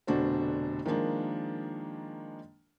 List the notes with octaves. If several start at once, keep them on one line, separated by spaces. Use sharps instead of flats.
F1 B2 D3 D4 F#4 C5
D#3 F3 G#3 A#3 D4